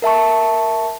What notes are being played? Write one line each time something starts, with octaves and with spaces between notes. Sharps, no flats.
A#4 E5 A5 C#6